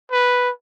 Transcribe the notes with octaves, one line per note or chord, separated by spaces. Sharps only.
B4